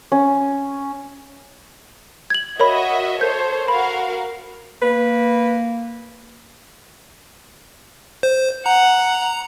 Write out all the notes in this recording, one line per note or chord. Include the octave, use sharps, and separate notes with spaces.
C#4
G#6 F#7
F#4 A#4 C#5 D#5 E5 B5
A4 A#4 C5 C#5 G6
F#4 A#4 F5 B5
A#3 B4
C5
F#5 A#5